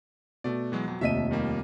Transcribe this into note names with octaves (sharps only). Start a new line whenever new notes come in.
B2 A3 D5
E3 F#3 G#3
F2 F#3
F1 D#2 D#5 E5 B6 D#7
D#3 G3 A#3